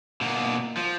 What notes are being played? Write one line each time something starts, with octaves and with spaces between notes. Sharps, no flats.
B2 A#3
F3